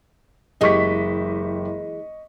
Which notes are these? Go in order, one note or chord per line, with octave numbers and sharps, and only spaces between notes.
F#1 E3 G#3 G4 D#5 C#6 B6